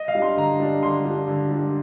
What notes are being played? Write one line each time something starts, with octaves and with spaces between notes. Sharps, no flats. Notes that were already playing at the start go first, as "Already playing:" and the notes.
Already playing: D#5
F5
G3 D4
C6
D3 A#5
G3 D4
D3 C6
G3 D4
D3
G3 D4